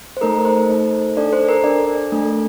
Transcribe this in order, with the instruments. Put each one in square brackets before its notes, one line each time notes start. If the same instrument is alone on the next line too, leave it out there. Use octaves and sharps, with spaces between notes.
[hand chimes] C5
A3 D#4 A4 A#4
C5
A3 D#4 A4
D4 A4 D5
C5
A#4
D4 A4 D5
A3 D4 A4